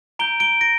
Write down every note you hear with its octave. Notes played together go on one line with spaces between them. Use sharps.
A#5 G6 D7 G7
D7 G7
A#6 D7